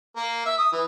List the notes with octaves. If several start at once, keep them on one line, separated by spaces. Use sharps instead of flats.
A#3
E5
D#6
E3